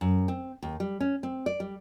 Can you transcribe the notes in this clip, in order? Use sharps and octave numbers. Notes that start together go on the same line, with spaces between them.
F#2
C4
D#2
G3
C#4
C4
D5
G3